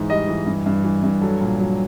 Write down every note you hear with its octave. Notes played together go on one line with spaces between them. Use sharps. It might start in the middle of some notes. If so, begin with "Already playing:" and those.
Already playing: G#2 E3
G3 D#5
E3
G2
G2
E3
G2
F#3 A4
A#2
F#3